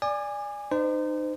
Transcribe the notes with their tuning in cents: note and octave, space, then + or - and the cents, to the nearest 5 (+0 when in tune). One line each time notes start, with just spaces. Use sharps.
D5 +0 G#5 -15 D6 +40
D#4 -30 C5 -35